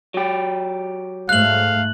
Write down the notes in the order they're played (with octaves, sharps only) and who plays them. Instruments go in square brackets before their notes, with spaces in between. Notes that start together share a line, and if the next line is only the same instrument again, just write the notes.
[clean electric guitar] F#3 G4
[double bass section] G#2 A3 [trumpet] F5 [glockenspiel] F#6 F#7